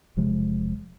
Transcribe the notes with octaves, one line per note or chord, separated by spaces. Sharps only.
E1 C3 F3 G#3